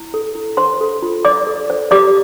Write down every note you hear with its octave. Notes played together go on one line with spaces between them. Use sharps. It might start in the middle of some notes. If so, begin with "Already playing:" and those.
Already playing: E4
A4
E4
C5 C6
A4
F4
C5 D5 D6
A4
C5
G4 D5 D6